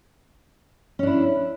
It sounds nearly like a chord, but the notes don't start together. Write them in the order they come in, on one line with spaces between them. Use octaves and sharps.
C#4 D4 E4